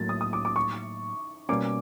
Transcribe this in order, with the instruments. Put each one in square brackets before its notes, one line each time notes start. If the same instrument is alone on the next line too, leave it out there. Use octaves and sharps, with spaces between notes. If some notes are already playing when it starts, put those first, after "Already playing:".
Already playing: [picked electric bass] A2 F#3 A#3 [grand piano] A6
[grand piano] D#6
D#6
D6
D6
C#6
[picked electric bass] B2 G3 A#3 C#4 [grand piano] D6